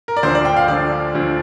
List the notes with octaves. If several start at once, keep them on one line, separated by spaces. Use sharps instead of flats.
A#4
D5
D2 D3 F3 C5
D5
G5
F5
D2 D3 F3 D5
D2 D3 F3